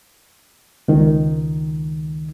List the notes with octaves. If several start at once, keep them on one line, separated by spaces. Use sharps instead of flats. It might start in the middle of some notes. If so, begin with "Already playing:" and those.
C#2 D#3